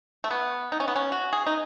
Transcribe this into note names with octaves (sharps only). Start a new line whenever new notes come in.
A3
B3
D#4
C#4
B3
C#4
F#4
G#4
D#4